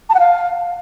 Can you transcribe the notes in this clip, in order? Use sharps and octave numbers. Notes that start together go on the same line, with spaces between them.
A5
F#5
F5